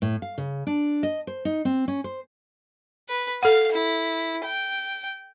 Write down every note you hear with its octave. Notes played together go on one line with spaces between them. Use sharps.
A2
F5
C#3
D4
D#5
C5
D#4
C4
C#4
C5
B4
A4 F5 F#5
E4
G5